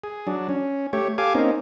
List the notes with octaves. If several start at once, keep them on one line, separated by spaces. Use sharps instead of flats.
G#4
F#3 D4
C#4
A3 G4 C#5
G4 A4 F5 G#5 D6
A#3 C4 C#4 D#4